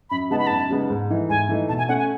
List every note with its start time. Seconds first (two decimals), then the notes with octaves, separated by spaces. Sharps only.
0.10 F#2 B5
0.30 C#3 G#3 B3 D#4 A5
0.39 B5
0.47 F#2 A5
0.70 C#3 G#3 B3 D#4
0.90 G#2
1.10 E3 A3 D#4
1.29 G#2 G#5
1.49 E3 A3 D#4
1.68 B2 A5
1.78 G#5
1.89 A3 C#4 F#5
1.99 G#5